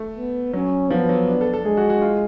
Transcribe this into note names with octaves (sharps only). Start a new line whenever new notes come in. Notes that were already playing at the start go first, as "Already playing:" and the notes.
Already playing: A3
B3
F#3 C#4
F3 B3
F#3
D4
A4
A4
G#3 G#4
F#4
F#4
F4